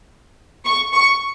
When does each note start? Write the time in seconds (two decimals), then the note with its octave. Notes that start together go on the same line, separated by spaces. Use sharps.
0.65 C#6
0.93 C#6